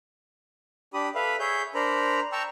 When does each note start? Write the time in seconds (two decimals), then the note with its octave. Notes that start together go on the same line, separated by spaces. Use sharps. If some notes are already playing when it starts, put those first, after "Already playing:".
0.94 D4 G4 B5 D#6
1.15 A4 B4 E5 F5 B5
1.40 G#4 C#5 E5 G6
1.75 D4 A#4 C5 A#5 B5
2.32 G5 A5 A#5 C#6 E6